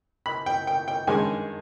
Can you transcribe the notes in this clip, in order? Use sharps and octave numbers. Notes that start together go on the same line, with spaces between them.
B5
G5
G5
G5
G2 D#3 G#3 C#4 G#5